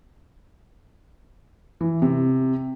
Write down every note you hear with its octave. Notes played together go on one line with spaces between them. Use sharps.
E3
C3